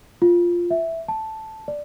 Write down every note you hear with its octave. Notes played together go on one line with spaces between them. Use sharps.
F4
E5
A5
D5